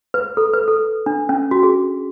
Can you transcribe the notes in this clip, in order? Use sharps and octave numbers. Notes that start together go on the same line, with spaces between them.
B4
A4
B4
A4
D4
C#4
F#4
G#4